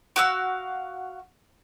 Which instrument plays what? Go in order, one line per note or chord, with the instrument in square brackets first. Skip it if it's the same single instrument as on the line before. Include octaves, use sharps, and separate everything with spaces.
[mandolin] F#4 F5 E6